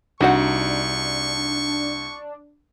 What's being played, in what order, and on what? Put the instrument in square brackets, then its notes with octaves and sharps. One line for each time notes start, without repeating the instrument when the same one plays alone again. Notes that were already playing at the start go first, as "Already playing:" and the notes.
[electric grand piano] C2 [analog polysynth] D4 [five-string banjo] D#4 F#4 F#5 [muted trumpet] C#6